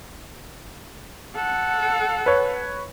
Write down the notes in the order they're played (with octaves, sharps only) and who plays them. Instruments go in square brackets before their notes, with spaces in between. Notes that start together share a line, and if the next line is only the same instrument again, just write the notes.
[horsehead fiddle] A4 F#5
[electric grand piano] B4 C#5